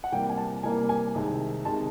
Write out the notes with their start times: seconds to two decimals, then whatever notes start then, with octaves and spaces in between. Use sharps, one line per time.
0.04 F#5
0.12 C3 E3 G3 A#3 G5
0.30 G#5
0.38 A5
0.63 C3 E3 G3 A#3 G#5
0.89 G#5
1.14 C2 C3 D#3 G#3
1.65 C3 D#3 G#3 A5